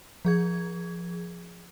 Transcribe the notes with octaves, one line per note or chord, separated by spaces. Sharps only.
F3 G#4 G#6